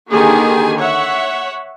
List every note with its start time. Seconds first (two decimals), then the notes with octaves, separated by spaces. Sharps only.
0.10 D3 D#3 A#3 G4 G#4 G#5
0.79 C#5 E5 F#5